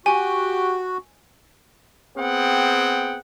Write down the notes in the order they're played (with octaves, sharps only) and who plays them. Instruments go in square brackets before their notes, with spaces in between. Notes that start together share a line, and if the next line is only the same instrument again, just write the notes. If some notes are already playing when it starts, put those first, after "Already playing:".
[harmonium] F#4 [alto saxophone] G4 [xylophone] G#5
[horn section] B3 C4 G#4 F#5 G5